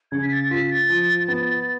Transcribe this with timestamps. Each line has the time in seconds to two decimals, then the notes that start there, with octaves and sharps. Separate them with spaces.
0.12 C#3 G#6
0.23 B6
0.32 A6
0.51 F4 B6
0.70 A6
0.89 F3
1.28 B3